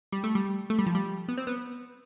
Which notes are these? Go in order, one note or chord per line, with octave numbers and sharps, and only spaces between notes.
G3
A3
G3
A3
G3
F3
G3
B3
C4
B3